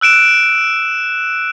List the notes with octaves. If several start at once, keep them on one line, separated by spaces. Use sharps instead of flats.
E6 F#6 D7 E7